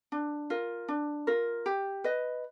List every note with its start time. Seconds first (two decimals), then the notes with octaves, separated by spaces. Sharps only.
0.12 D4
0.50 F4 A#4
0.88 D4
1.27 F4 A#4
1.66 G4
2.04 B4 D#5